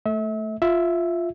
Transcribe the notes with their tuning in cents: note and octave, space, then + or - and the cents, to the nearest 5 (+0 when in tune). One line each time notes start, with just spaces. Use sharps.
A3 +0 E5 -35
F4 +0 E5 +0